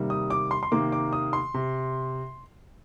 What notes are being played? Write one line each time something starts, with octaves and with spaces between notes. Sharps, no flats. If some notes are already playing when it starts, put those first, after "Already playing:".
Already playing: C3 D#3 G3 A#3
D#6
D6
C6
C6
C3 D#3 A#3 D6
D6
D#6
C6
C3